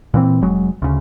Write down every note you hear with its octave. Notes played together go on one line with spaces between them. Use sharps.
A#2 E3 C4
F1 F#3 G#3
D2 C#3